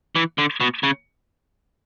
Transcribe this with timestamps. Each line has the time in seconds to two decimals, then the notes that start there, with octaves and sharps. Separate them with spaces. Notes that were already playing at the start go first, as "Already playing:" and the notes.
0.16 E3
0.38 D3
0.60 B2
0.83 C#3